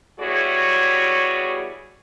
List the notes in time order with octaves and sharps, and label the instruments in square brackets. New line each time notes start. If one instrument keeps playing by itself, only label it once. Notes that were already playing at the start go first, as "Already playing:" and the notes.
[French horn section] E2 G3 E4 F#4 G#4 C#5